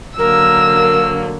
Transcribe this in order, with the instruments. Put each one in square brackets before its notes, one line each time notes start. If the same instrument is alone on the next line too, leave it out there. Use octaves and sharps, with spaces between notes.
[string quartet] D3 F#3 A#3 [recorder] A#4 [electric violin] E6